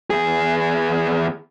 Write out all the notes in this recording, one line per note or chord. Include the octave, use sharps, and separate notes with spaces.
E2 G#4